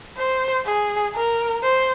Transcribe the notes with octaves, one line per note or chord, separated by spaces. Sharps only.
C5
G#4
A#4
C5